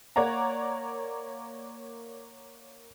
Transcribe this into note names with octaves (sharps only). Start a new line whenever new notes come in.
A#3 C#5 D5 F#5 A#5